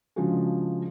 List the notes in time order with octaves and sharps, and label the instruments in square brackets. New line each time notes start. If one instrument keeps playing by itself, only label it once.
[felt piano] C#3 F3 G#3 D4 F#4 G#4